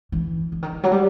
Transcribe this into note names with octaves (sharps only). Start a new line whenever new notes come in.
E3
D3
D#3
D3
F#3
G3